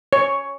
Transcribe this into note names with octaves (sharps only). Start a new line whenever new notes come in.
C#5